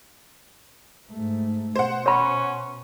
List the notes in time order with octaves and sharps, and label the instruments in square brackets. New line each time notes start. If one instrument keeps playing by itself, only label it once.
[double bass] G#2 A3
[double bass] B2 [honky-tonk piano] C5 F#5
[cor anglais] C#4 [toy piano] C#5 B5